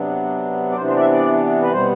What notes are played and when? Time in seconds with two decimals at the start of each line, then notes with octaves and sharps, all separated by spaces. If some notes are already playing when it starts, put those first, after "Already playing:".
Already playing: C3 F#3 B3 D4
0.71 D5
0.77 C3 E3 B3 D4 C5
0.88 C5
0.96 D5
1.00 E5
1.12 D5
1.62 B4
1.72 B2 G3 B3 C5